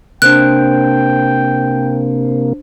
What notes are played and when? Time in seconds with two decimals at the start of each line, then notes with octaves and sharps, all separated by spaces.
0.22 C3 A#3 D4 C5 G5 F#6 D7